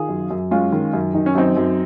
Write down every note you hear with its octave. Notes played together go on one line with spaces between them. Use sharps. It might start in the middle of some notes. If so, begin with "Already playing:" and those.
Already playing: D#3 F4 G#4
F#2
F#2
G#3 C#4 F4
D#3
F#2
D#3 D#4
C#4
F#2 C4 D#4
F#2